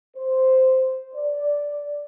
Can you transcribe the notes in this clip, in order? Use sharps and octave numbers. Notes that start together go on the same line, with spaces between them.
C5
D5